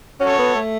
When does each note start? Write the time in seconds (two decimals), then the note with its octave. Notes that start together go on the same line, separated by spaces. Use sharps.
0.20 C#4 F#4 A4 C#5
0.38 B3
0.55 A3